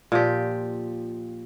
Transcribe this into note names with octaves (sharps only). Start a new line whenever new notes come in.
A#2 F3 G4